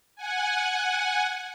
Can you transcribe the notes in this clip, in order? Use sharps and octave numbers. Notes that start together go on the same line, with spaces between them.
F#5 G#5